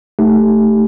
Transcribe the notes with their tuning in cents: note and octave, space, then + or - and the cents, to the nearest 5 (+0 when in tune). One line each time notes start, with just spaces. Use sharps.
A3 +0 D#4 +0 G4 +0